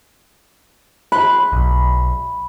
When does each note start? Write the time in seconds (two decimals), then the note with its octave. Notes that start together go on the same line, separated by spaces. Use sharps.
1.12 B5 C6 F#6
1.52 B1